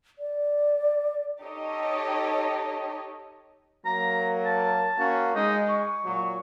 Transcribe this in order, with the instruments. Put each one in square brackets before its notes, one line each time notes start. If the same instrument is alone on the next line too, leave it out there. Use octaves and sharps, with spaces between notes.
[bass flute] D5
[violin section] D#4 G4 A4 C#5 D#5
[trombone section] F#3 A#3 [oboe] A#5
[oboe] A5
[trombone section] A#3 C#4 F#4
[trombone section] G#3 [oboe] D#4
[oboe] C#6
[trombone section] A#2 F#3